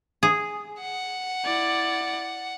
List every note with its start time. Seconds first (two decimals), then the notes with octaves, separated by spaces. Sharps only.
0.23 G#4
0.81 F#5
1.45 E4 D5